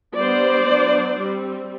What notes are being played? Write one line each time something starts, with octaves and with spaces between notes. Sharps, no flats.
G3 B3 D4 C5 D5
F#3 B3 D4
G3 C4